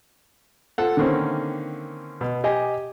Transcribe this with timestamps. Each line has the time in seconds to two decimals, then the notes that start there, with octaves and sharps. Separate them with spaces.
0.78 F4 A4 F#5
0.97 D3 D#3 A#3 C4 C#4
2.21 B2
2.44 G4 D#5 G#5